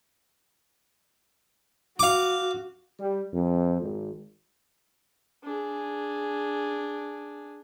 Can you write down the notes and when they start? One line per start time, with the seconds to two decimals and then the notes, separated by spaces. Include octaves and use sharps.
1.99 F#4 F5 D6
3.00 G3
3.33 F2
3.82 G#1
5.44 D4 G#4